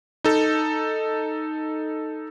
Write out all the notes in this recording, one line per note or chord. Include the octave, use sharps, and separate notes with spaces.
D#4 A4